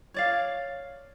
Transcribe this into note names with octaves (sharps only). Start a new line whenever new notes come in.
C#5 D5 F5